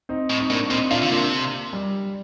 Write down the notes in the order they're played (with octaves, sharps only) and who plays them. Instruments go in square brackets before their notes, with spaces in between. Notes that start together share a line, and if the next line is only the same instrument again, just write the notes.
[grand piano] C4 D#4
[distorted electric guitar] A2
[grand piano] D#4
[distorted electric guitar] A2 [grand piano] A#3 D4
[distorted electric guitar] A#2 [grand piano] C4 D#4
[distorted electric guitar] A#2 [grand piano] D4 F4
[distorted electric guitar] D3
[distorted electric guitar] C3 [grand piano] A#3 D4
[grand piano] G3